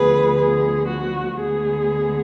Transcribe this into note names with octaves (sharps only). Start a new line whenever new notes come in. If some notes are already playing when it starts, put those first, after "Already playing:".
Already playing: D2 D3 F3 B3 G#4 B4
G#4
F#4
D2 D3 G#3 B3 G#4